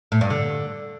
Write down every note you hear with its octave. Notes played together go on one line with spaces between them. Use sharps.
A2
G2
D3